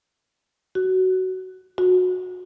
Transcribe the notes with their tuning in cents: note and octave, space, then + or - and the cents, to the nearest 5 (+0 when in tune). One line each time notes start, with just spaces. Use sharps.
F#4 +15
F#4 -20